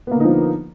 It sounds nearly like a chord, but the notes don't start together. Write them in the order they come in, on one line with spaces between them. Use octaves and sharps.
B3 A#3 D3 D#4 F3